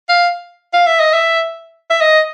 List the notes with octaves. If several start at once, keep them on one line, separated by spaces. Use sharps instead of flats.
F5
F5
E5
D#5
E5
E5
D#5